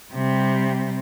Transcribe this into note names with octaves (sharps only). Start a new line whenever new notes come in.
C3 G3